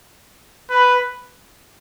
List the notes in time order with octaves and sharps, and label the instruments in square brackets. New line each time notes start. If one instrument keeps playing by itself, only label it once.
[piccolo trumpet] B4